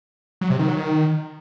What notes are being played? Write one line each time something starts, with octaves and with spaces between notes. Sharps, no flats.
F#3
C3
D#3
F#3
D#3